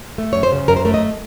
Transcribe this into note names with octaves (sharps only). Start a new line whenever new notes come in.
A3
F#2 C#5
C5
C#3
F#2 A#4
C5
A3 A#4
D#5